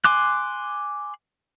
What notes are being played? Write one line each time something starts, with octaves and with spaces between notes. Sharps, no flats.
G#5 C6 D6 F#6